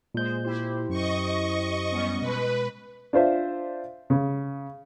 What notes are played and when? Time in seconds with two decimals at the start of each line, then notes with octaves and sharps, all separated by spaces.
0.15 A#2 G#3 G#4 C5 G6
0.45 E4 G4 C5
0.90 F#2 D#5 C#6
1.91 G3 B3 C#4
2.21 B2 G#3 B4
3.13 D4 F4 C5 E5
4.10 C#3